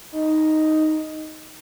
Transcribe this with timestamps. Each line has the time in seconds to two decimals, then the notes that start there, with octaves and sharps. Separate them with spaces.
0.12 D#4